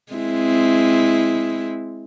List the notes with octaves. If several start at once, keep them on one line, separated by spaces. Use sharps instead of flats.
G#3 C4 E4